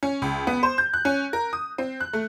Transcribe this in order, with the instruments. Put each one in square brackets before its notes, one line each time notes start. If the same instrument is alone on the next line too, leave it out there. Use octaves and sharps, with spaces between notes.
[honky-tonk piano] C#4
C#2
B3
C5
G6
F#6
C#4
A#4
D#6
C4
F#6
A3